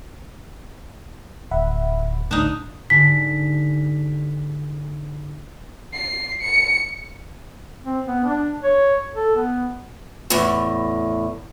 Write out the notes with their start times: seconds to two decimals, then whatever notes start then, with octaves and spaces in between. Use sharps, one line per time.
1.51 D1 E5 F#5 B5
2.31 A1 D2 A2 D4 D#4
2.90 G#2 D3 G4 B6
5.93 C7
6.42 C#7
7.85 C4
8.07 B3
8.24 D4
8.64 C#5
9.15 A4
9.36 B3
10.30 E2 A2